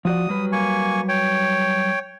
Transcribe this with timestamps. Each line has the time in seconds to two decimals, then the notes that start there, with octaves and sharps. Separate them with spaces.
0.05 F3 F#4 D5 D#6
0.29 F#3 G3 B4
0.52 A#3 G#5 C#6
1.09 C#5 G5